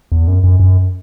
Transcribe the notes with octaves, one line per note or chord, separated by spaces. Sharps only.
E2
F#2
F#2
F#2